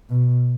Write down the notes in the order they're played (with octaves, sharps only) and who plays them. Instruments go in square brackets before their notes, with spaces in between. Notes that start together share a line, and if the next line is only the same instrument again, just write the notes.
[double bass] B2